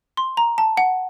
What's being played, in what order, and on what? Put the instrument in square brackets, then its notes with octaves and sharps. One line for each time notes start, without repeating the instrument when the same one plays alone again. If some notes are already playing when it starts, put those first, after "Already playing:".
[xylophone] C6
A#5
A5
F#5